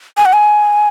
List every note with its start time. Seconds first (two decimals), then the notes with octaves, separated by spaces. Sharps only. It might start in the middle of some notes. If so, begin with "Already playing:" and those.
0.17 G#5
0.25 F#5
0.33 G#5